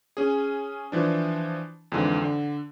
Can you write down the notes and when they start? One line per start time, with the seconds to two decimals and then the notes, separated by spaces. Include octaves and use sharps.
0.17 C#4 G#4
0.92 E3 F3 D4
1.92 F2 G#2 D3 E3
2.21 D3